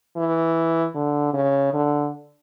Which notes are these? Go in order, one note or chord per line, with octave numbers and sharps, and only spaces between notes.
E3
D3
C#3
D3